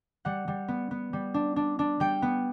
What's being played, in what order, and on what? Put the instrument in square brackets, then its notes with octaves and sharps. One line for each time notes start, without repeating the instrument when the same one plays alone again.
[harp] G3 F#5
G3
B3
B3
G3
D4
D4
D4
G3 G5
B3